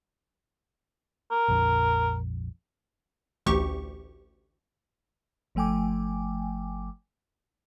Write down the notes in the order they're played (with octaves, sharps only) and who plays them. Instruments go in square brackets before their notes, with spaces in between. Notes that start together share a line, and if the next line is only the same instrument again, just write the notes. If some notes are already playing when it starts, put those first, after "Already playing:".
[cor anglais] A#4
[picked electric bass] A#1 F2
[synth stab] A1 D2 G4 C#6
[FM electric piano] G1 F3 A3 G5 G#5 D6